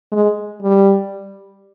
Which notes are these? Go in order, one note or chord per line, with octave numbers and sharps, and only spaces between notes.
G#3
G3